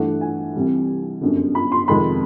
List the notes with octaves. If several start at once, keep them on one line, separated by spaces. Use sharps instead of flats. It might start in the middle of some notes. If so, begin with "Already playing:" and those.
Already playing: G2 E3 A3 D4 F#5
G#5
C2 C3 E3 G3
G1 F#2 D3
B5
C6
F2 C3 D#3 G#3 B5